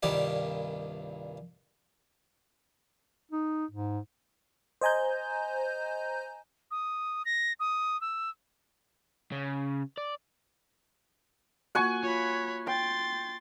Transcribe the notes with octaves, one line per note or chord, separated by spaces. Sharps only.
C2 G2 A#2 D#3 G4
D#4
G#2
C5 D#5 G#5 A#5 G6
D#6
A#6
D#6
E6
C#3
D5
A#3 F4 F#4 F#5 G#5 C#6
F4 C#5 B5
G5 C6 A6